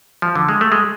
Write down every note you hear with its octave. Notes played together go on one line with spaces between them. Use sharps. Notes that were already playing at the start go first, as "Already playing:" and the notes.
F3
D3
G#3
A3
G#3